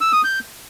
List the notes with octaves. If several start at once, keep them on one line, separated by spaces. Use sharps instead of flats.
E6
D#6
G6